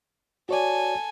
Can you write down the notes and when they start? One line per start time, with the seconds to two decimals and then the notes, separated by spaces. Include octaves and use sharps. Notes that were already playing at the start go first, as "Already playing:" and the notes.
0.49 F#4 A4 C#5 D5 G#5